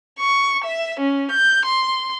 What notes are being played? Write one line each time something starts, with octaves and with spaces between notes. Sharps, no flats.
C#6
E5
C#4
G6
C6